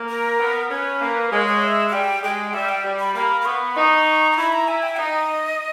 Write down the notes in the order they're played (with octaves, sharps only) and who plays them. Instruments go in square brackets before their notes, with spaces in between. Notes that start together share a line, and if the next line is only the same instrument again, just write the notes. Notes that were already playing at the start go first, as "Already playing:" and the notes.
Already playing: [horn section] A#3
[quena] A#4
[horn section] B3
[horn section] C#4 [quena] B4
[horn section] A#3
[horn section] G#3 [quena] C#5
[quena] C#5
E5
E5
[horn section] G3 [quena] G5
[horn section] G#3 [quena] G5
[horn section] G3 [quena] E5
[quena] G5
[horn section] G3
[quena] B5
[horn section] A#3 [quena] B5
[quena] B5
[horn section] B3 [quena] C#6
[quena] B5
[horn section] D#4 [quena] C#6
[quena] A#5
[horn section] E4 [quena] B5
[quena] A#5
[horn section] E4 [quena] G#5
[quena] G5
[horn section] D#4 [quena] D#5